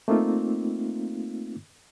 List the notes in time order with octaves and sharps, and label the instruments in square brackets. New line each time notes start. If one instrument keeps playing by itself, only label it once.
[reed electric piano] A3 A#3 C4 D#4 F4